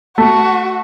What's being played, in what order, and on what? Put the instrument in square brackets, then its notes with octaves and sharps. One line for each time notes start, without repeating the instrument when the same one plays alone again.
[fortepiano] A3 [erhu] F#4